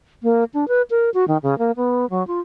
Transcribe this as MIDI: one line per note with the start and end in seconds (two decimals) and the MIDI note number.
0.23 0.44 58
0.54 0.68 62
0.68 0.82 71
0.90 1.10 70
1.14 1.25 66
1.28 1.38 51
1.43 1.58 49
1.58 1.71 58
1.76 2.08 59
2.10 2.26 54
2.27 2.40 65